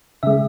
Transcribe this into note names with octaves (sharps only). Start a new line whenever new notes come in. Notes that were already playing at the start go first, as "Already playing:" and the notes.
C#3 G#3 E5